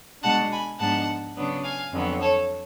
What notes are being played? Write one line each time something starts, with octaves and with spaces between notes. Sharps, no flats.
B2 G#3 D4 F#5 A5
G#5 B5
G#2 F3 G#3 B3 D4 F#5 A5
C#3 F#3 B3 D4
F5 G#5
F2 D3 F#3 B3
A4 C#5